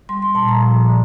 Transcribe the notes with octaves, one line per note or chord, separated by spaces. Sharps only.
G3 C6
C6
A#2 A5
A#5
F3
D3